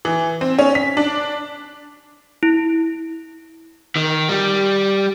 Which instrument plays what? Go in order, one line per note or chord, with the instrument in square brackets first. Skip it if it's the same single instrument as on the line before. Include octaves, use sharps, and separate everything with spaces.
[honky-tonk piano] E3
C4
C#4
B6
D4
[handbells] E4
[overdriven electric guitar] D#3
G3